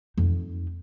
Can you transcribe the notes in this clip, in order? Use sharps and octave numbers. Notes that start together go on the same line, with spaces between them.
F2 D#4